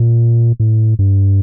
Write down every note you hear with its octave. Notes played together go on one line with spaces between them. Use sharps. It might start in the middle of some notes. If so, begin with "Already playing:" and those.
Already playing: A#2
A2
G2